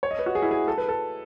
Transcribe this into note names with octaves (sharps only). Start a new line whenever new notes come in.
C#5
D#5
B4
F#4
G#4
E4
G#4
A4
B4
A4